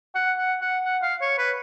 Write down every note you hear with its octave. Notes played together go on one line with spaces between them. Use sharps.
F#5
F#5
F#5
F#5
F5
C#5
B4